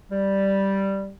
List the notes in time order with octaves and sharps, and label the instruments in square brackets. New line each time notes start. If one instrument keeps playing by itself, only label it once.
[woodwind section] G3